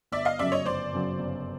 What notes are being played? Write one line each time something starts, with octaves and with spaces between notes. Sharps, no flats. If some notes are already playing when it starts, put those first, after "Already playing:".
G1 D5 E5
D#5 F5
F#2 C#3 F#3 D5 E5
C#5 D#5
G1 C5 D5
F#2 C#3 F#3
G1